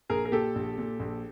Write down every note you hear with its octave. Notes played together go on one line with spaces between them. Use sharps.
A#1 G#4 A#4
A#4
A#2 G4 A4
A#1
A#2
A#1